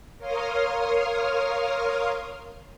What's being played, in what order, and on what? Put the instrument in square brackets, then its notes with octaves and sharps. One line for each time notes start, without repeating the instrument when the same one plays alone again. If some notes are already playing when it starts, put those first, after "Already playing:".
[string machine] A#4 C#5 F5 C6 D#6 F6